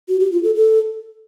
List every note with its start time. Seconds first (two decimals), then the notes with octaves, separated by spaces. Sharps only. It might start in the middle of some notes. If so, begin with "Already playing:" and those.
0.08 F#4
0.20 G4
0.32 F4
0.43 A4
0.55 A4